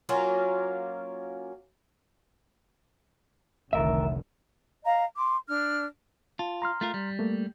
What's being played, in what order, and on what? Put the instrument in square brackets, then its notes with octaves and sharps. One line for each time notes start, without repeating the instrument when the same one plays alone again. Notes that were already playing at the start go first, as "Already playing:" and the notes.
[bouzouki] F#3 A#3 C#4 F4
[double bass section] F1 C2 D3 [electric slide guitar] D#3 A#4 E5
[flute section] D#5 F5 A#5
C6 D6
D4 F6
[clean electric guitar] F4 [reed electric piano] A5
[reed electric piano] A#5 C6 F6
[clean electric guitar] A3 F4 A#4
G3
[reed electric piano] A3 A#3